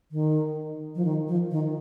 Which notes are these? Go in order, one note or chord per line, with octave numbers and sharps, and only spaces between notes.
D#3
F3
D#3
F3
D#3